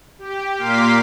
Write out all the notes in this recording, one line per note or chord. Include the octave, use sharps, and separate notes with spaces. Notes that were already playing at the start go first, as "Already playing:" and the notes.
G4
A#2 A#3 F5 C6 D6 B6